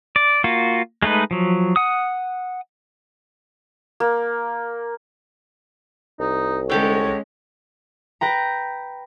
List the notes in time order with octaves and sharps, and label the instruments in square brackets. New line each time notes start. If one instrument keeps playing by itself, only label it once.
[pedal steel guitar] D5
A#3 F4 F#4
G#3 A3 D#4 B4
F3 F#3
F#5 D#6
[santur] A#3
[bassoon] C2 [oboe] D#4
[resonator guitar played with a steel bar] D3 G4 A4 [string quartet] G#3 C#4 [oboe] C#5
[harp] B4 G5 A#5